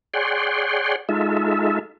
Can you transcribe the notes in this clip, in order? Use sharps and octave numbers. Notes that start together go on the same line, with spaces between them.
G#4 C#5 D5 F#5 G5 C6
G#3 D#4 F4 A4 E5